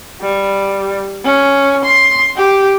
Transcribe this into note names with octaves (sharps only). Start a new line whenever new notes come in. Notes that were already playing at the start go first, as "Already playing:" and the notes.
G3
C#4
C6
G4